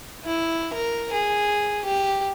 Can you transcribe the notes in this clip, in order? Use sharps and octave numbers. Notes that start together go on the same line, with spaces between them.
E4
A#4
G#4
G4